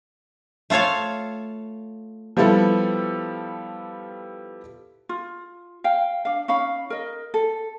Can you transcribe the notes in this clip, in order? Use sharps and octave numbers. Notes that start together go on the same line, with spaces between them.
A3 F4 A4 C#5 F5
F3 G3 B3 E4 A4
F4
F5 G5
D4 F5
C#4 D#4 F5 B5
A#4 D#5
A4